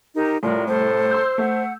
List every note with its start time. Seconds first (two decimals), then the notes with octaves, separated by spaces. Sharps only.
0.15 D#4 G4 A#4
0.43 C2 A2 F4 A#4 D5
0.68 A4 C5
1.11 C6 E6 G6
1.38 A3 F#5